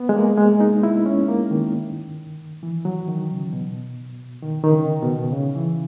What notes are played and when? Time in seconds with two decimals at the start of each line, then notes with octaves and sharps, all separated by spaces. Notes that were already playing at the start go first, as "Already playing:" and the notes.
Already playing: B3
0.09 G#3
0.16 A#3
0.38 G#3
0.60 D#4
0.83 E4
1.06 C#4
1.28 A#3
1.51 D#3
2.63 E3
2.85 F#3
3.08 D#3
3.31 C#3
3.53 B2
4.42 D#3
4.64 D#3
4.72 C#3
5.02 B2
5.32 C#3
5.56 E3